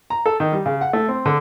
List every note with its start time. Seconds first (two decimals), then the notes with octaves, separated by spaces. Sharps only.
0.10 A#5
0.26 A4
0.40 D#3
0.52 G3
0.66 C#3
0.81 F#5
0.93 A3
1.08 C4
1.26 D3